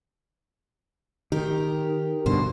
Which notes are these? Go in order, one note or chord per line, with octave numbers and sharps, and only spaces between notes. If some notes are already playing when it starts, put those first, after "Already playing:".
D#3 G4 A#4
G2 B2 D3 C5